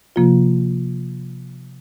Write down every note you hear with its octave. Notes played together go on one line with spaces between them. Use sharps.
C3 F3 A#3 F4